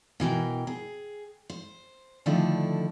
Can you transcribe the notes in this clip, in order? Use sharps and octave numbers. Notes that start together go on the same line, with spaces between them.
B2 E3 A#4 G5
G#4
C5
D3 D#3 F3 A3 D4 E4